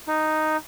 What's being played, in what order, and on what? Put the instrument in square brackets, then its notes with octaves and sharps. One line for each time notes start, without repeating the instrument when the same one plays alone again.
[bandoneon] D#4